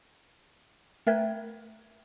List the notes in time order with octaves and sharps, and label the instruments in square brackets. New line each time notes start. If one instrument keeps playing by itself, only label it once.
[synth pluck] A3 E5 G#6 [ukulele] A#4 B4 G5